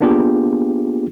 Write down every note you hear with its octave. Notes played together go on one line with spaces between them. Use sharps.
A#3 B3 D4 F4 G4 G#4